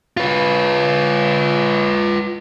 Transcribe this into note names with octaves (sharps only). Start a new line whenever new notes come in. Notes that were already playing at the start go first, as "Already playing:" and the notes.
F4 B4